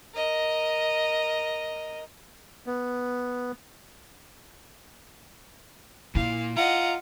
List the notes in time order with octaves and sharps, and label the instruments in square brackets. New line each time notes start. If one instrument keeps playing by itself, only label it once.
[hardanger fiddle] A#4 D#5
[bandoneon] B3
[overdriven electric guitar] A#2 [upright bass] E4 [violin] F5
[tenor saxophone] F4 [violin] D#5 F#5 [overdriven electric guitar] A#5